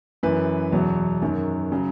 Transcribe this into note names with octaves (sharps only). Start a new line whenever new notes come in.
F#2 E3 B4
E2 B2 F#3
F#2 D#3 F#3
C#3 F#3